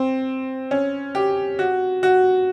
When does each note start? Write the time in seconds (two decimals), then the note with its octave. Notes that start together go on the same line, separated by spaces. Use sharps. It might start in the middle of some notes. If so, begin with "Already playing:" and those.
Already playing: C4
0.71 C#4
1.15 G4
1.59 F#4
2.03 F#4